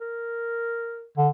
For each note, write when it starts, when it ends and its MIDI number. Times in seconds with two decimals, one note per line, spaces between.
0.01 1.06 70
1.17 1.29 50